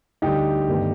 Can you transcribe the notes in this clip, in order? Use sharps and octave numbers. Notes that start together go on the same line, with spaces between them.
D2 D3 G3 D#4 G4
G1 G2 D#3 A3